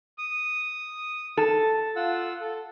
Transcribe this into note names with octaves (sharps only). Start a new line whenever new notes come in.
D#6
A4
F4 F#5 E6
A4